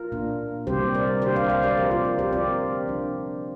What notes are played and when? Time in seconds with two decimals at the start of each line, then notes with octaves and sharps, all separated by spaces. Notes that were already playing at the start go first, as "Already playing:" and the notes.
Already playing: F4 A#4
0.12 A#2 A#3 D4
0.67 C3 G3 C4 G4 C5
0.95 A#4 D5
1.22 D3 A#3 D4 G4 C5
1.36 C5 F5
1.50 C5 F5
1.63 A#4 D5
1.77 F3 C4 G4 C5
1.91 F4 A#4
2.05 F4
2.19 G4 C5
2.32 D3 F3 C4 A#4 D5
2.87 F3 D4